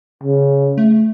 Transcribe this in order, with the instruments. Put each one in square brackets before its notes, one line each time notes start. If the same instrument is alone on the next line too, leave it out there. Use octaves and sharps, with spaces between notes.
[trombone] C#3
[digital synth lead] A3